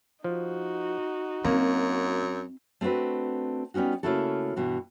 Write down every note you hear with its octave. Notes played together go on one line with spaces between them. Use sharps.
F3 D#4 F#4
F#2 A#3 C4
A3 C4 D4 F#4 B4
G3 B3 C#4 D#4 F#4
C#3 A3 A#3 E4 F#4 A4
G2 B2 E3